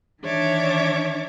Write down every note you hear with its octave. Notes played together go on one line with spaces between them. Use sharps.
D#3 E3 D4 C#5 E5 D6